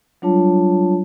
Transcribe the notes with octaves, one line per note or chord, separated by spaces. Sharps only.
F#3 G3 D4 F4 C#5 A5